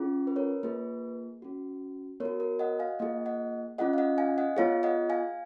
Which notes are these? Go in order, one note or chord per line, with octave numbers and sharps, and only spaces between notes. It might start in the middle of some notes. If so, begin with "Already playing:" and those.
Already playing: C#4 F4 G#4
B4
A#4 C#5
A#3 F4 G#4 B4
C#4 F#4
B3 A#4 C#5
F#4
A#4 C#5
D#5 F#5
F5 G#5
A#3 F4 G#4 D#5 F#5
D#5 F#5
C#4 F4 G#4 D#5 F#5
F5
D#5 F#5
F5 G#5
D#5 F#5
B3 F4 G#4 C#5 F5
D#5 F#5
F5 G#5